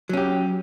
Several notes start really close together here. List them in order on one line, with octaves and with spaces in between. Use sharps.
F#3 C#4 G4